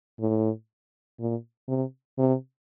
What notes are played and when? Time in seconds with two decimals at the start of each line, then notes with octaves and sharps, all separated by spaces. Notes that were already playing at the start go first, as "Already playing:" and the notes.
0.20 A2
1.20 A#2
1.68 C3
2.19 C3